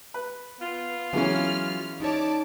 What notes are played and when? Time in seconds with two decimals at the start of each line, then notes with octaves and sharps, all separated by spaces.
0.14 B4
0.61 B3 F4
1.13 E3 F#3 G#3 B3 C#4 F6
2.00 D#4 G4 C#5 D5 A5 D6